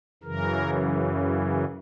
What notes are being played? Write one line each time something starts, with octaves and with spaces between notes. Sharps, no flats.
F#2 C#3 E3 A#4